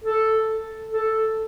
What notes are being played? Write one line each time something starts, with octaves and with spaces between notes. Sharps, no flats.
A4
A4